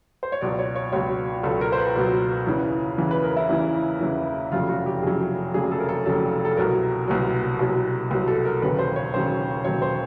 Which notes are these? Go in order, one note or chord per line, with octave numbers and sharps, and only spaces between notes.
C5
C#5
C#2 B2 F#3 D5
C#5
C#5
C#2 B2 F#3 C#5
C#2 B2 F#3 A4
A#4
C5
B4
C#2 B2 F#3
E2 C#3 E3
E2 C#3 E3
B4
A#4
E4
E2 C#3 E3
E2 C#3 E3
F1 F2 C#3 F#3 F4
F#4
G4
F1 F2 C#3 F#3 G#4
F1 F2 C#3 F#3 G#4
A4
A#4
A4
F1 F2 C#3 F#3 A4
A4
C2 B2 F#3 A#4
C2 B2 F#3
C2 B2 F#3
C2 B2 F#3
A4
A#4
E1 D#2 C#3 F#3 B4
C5
C#5
E1 D#2 C#3 F#3 C5
E1 D#2 C#3 F#3 C#5
C5